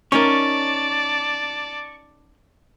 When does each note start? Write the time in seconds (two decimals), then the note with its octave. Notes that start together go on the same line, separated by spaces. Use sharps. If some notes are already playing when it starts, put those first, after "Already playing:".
0.12 C#4 D#4 A#4 D5 A5 C#6